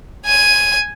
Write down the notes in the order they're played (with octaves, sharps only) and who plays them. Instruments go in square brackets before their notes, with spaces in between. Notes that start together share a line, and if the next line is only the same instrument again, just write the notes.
[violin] G#5 D#7